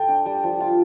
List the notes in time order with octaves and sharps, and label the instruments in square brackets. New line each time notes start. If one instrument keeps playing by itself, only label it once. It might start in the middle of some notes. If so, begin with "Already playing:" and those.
Already playing: [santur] A4 [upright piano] G5
[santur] D4
G3
F3
F4